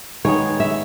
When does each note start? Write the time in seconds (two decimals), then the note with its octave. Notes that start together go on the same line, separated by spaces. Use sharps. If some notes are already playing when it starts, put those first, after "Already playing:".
0.25 D#3 G#3 B3 C#5
0.60 E5